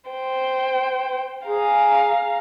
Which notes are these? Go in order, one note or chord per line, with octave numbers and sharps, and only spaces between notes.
C5 G5
G#4 F5 A#5